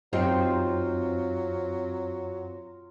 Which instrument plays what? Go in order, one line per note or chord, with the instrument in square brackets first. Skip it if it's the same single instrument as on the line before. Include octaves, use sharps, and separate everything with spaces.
[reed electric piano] F#2 [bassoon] F#3 [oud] C4 D#4 G4 [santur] F4